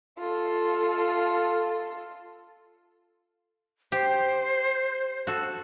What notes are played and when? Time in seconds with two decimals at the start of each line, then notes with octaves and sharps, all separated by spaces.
0.19 F4 A4
3.92 G4 C5
5.27 F#4 A4